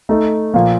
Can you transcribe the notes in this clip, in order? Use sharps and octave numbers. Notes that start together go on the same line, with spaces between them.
A3 D#4 A4
A#2 F3 A#3